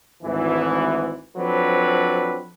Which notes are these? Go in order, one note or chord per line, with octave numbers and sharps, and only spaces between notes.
G#1 D2 G#2 E3
F3 F#3 C4 D4 A4 B4